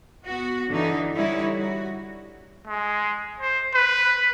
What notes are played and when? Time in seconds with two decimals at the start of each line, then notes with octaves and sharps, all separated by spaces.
0.25 B3 F#4
0.69 D3 E3 D#4
1.15 D3 G3 D#4 E4 C#5
1.56 F#4
2.67 G#3
3.40 C5
3.75 B4